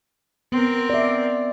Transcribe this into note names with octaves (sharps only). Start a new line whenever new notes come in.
B3 C4 A#4
D5 E5